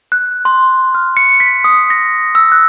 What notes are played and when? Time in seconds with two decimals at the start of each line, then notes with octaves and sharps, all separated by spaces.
0.12 F#6
0.45 C6
0.95 F6
1.17 C#7
1.40 B6
1.64 D#6
1.90 A#6
2.35 E6
2.52 F#6